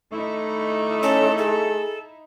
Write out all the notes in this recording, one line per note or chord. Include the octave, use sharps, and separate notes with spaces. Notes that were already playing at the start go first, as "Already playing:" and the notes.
A3 D#4 E4
C#4 A4
G#4 A4